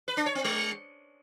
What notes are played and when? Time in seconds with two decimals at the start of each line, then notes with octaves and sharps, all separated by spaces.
0.08 B4
0.17 D4
0.26 C#5
0.35 C4
0.44 G#3